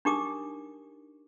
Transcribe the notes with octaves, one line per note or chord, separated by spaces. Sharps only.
D4 D#4 G4 A#4 D6 D#6